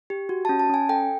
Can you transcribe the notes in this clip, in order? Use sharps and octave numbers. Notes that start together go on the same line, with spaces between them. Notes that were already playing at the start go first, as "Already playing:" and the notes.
G4
F#4
A5
C#4
A5
C#4 G#5
A4 G5